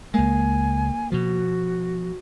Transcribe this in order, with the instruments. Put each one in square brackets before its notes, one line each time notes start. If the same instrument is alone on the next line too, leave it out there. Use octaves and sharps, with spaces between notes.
[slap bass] C#2 G#3 [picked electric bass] A#3 [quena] G#5
[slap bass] B2 F3 [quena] F#4